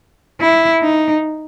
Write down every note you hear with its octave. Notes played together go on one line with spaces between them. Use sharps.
E4
D#4